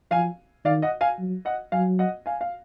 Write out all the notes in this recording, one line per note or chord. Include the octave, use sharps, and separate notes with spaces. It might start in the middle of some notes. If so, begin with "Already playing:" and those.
F3 F5 G#5
D#3 D5 F5
D#5 F#5
F5 G#5
F#3
D#5 F#5
F#3 F5 G#5
D#5 F#5
F5 G#5
F5